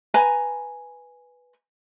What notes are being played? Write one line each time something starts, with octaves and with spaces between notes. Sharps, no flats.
B4 G#5 A#5